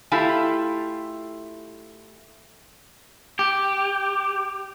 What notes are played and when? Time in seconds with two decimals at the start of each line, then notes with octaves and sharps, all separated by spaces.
0.12 A3 E4 F4 G4 G#5
3.39 G4